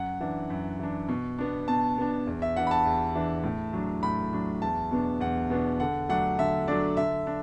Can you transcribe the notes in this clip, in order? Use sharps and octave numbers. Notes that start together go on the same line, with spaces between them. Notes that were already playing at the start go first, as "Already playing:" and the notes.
Already playing: F#2 F#5
E3 D4
F#2
E3 D4
B2
B3 D4
B2 A5
B3 D4
E2
E5
E3 D4 F#5
B5
A5
E2
E3 D4
A2
F#3 D4
A2 B5
F#3 D4
E2 A5
B2 B3 D4
E2 F#5
B2 B3 D4
D3 F#5
F#3 A3 D4 F#5
D3 E5
F#3 A3 D4 D5
D3 E5
D4